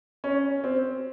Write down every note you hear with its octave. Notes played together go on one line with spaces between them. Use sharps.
C#4
C4